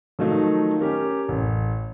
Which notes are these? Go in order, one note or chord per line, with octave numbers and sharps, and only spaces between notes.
D#3 F3 F#3 A3 D#4
C#4 G4 A#4
A1